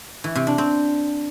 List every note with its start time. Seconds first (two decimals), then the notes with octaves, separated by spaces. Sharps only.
0.24 E3
0.35 C3
0.47 D4
0.58 C4